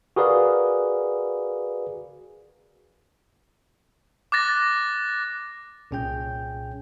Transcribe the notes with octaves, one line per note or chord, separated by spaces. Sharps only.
F#4 G#4 A#4 B4 D5 F5
D6 F#6 A6 A#6
C2 A#2 C#4 G#4 G5 G6